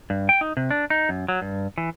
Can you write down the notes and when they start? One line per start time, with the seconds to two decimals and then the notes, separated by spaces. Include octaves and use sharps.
0.10 G2
0.29 G5
0.41 D#4
0.57 C3
0.71 D4
0.90 D#4
1.09 F#2
1.28 F#3
1.42 G2
1.78 E3